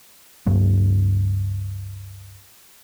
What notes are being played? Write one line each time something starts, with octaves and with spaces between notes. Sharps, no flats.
C#2 G2 F#3 A#3